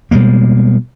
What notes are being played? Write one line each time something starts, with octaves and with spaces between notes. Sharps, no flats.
B2 G3 G#3 A#3